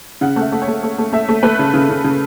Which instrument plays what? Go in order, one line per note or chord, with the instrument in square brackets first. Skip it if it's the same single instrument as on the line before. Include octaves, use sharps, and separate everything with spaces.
[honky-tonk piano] C#3 F#5
A3
E5
A3
C#5
A3
A3
A3
A3 E5
A3
A3 B4
C#3
C#3
C#3
C#3